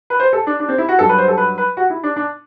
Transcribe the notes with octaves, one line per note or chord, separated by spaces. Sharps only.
B4
C5
A4
D4
D4
C4
E4
F#4
G2 F#3 A4
B4
C5
A4
B4
B4
F#4
E4
D4
D4